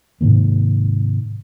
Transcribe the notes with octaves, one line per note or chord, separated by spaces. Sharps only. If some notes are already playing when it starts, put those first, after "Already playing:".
G#2 C3 D#3 A#3